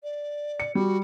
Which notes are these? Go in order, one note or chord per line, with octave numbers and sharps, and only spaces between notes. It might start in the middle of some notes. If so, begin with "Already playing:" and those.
D5
C#7
G3 F#4